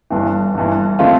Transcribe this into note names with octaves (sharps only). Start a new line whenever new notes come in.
G1 G2 E3
G1 G2 E3
D3 A3 C4 F4